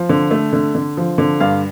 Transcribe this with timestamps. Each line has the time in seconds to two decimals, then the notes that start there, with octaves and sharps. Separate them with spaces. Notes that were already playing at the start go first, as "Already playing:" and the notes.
Already playing: F3
0.09 D3
0.31 A3
0.53 D3
0.75 D3
0.97 F3
1.18 D3
1.40 G2 F5